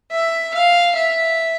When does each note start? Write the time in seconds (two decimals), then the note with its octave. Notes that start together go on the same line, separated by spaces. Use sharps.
0.12 E5
0.54 F5
0.96 E5